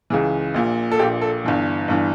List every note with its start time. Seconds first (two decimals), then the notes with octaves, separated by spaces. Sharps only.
0.10 C#2 C#3 E3
0.54 A#1 A#2
0.92 A4
0.99 A#1 A#2 G4
1.21 A4
1.45 G1 G2 E3
1.88 G1 G2 E3